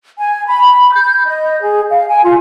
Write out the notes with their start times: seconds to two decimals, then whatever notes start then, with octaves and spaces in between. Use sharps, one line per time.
0.18 G#5
0.47 B5
0.92 G6
1.26 D#5
1.61 G#4
1.90 F5
2.08 G#5
2.25 F4